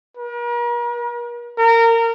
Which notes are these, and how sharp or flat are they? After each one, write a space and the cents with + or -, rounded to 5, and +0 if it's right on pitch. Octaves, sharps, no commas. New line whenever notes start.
A#4 +40
A#4 -20